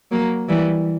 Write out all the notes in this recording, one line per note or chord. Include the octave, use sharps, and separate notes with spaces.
F#3 A#3
E3 G3